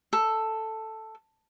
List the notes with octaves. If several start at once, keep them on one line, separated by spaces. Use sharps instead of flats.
A4